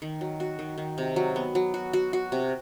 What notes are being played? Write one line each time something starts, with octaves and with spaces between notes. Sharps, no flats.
D#3
F#3
F#4
D#3
D#3
C3
F#3
B3
F#3
F#4
F#4
F#4
C3